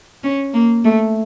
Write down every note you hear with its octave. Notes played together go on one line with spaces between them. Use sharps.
C#4
A#3
A3